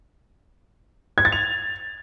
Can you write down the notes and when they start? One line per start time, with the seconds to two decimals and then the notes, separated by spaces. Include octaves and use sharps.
1.18 G#6
1.25 A6
1.32 F7